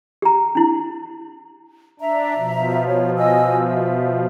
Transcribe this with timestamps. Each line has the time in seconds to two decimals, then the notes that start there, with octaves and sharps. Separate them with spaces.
0.22 G4 A#5
0.55 D4 E4
2.00 D4 E5 A#5
2.36 B2 F3
2.86 C#5
3.17 D#5 G#5 E6
3.67 E5